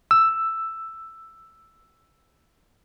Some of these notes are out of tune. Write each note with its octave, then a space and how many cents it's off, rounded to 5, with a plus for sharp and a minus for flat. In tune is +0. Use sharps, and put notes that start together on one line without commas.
E6 +5